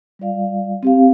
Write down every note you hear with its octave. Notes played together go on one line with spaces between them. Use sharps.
G3 F4 D5 F5
C4 G4 F5